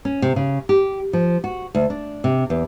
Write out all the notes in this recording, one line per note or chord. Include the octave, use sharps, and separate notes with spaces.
C#4
C3
C#3
G4
F3
F#4
D2
D4
C3
E2